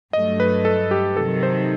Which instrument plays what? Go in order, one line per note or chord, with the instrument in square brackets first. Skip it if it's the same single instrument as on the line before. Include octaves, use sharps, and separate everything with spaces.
[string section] G2 F#3 A3 [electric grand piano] D#5
[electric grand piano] B4
A4
G4
[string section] C3 D#3 F#3 [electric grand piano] A4
[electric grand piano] C5